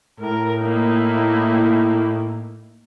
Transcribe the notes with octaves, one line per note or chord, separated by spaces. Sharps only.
A2 A#4
A#3 D#4 E4